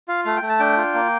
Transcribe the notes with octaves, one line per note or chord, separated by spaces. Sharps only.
F4 F5
A3 F5
G5
A3
A5
D4 G5
F4
A#3